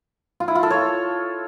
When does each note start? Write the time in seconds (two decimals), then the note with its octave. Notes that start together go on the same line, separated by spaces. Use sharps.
0.40 F4
0.48 E4
0.55 F4
0.63 A4
0.70 C#5